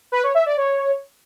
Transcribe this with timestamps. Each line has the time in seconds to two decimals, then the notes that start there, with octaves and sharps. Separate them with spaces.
0.12 B4
0.23 C#5
0.35 E5
0.46 D5
0.57 C#5